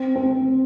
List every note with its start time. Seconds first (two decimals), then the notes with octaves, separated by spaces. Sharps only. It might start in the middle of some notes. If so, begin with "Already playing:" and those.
Already playing: C4
0.16 C4